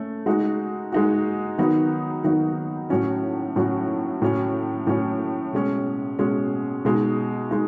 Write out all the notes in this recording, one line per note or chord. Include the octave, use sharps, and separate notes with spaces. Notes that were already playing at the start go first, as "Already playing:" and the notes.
Already playing: A3 C#4
G#3 D#4 F#4
G#3 D#4 F#4
D#3 F#3 B3 D#4 F#4
D#3 F#3 B3 D#4 F#4
A2 F#3 C#4 F#4
A2 F#3 C#4 F#4
A2 F#3 C#4
A2 F#3 C#4
B2 G#3 C#4
B2 G#3 C#4
B2 G#3 D#4
G#3 D#4